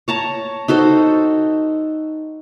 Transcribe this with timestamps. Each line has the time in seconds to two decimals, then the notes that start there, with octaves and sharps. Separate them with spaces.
0.08 C#5 A5 A#5
0.68 D#4 F#4 A4 C5